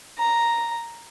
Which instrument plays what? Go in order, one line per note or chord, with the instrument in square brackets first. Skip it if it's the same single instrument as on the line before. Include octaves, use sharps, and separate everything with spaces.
[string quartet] A#5